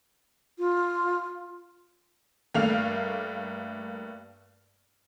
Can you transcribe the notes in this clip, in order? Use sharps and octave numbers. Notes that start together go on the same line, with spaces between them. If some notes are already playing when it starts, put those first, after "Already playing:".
F4
G2 A3 A#3 F5 F6 F7